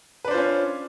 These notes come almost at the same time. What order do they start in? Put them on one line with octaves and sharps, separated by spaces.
B4 D4 C5 F4 C#4